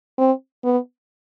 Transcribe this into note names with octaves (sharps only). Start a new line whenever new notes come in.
C4
B3